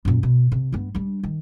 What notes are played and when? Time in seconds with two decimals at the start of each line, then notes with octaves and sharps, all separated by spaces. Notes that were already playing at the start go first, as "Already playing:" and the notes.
0.05 F#2 A#2
0.23 B2
0.52 C3
0.72 G2 B3
0.95 G3 D4
1.23 D#3